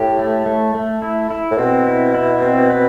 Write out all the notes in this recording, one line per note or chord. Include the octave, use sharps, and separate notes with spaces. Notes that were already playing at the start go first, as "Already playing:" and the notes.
Already playing: A2 G4
A3
A3
A3
E4
E4
A2
B2 C4
E4
E4
C4
B4